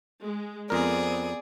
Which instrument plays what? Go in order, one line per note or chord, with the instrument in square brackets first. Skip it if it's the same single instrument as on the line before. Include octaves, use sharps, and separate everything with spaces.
[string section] G#3
[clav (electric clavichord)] F2 A#4 [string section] B3 C4 [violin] G#4 D5